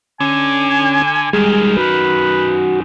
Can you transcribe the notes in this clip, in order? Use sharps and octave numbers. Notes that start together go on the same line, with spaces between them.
D3 C#4 G#5
F#2 D#3 G3 G#3 G#4
F#4 B4